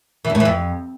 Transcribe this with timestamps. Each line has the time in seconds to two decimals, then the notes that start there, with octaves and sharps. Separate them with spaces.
0.25 E3
0.30 E2
0.35 A2
0.40 E3
0.45 F2